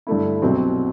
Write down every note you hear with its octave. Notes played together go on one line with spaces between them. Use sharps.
G2 D3 A3 E4
C2 B2 F#3 C4